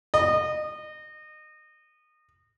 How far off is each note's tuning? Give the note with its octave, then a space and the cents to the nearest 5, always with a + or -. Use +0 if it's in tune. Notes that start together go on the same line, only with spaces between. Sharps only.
D#5 -30